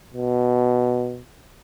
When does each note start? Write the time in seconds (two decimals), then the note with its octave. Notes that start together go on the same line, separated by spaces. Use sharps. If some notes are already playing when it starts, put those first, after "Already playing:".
0.14 B2